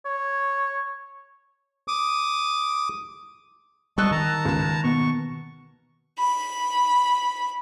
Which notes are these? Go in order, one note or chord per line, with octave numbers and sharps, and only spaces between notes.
C#5
D6 D#6
G3 D#5 A5 C#6 E6 F#6
D#3 A5 A#5
C#2 E7
B2 C#6
B5